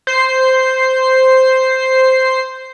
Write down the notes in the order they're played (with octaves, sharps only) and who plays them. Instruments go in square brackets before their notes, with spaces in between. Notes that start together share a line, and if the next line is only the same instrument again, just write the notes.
[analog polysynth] C5 C7